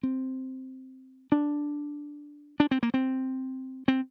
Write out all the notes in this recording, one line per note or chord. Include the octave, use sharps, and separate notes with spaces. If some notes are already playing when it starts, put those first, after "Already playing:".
C4
D4
D4
C4
A#3
C4
C4